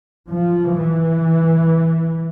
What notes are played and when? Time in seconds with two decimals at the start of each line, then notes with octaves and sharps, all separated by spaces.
0.32 F3
0.79 E3